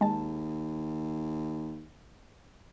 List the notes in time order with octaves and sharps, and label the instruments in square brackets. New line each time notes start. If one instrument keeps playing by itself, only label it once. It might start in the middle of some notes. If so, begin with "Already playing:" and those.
[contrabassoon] D#2 [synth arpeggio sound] G#3 A5